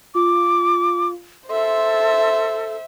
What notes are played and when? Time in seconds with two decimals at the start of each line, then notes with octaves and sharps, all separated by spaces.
0.15 F4 D6
1.49 A4 C5 E5 C6